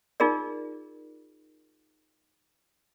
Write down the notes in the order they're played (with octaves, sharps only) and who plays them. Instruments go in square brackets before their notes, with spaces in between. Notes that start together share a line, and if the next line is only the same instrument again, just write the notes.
[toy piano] D#4 F4 G#4 A#4 D5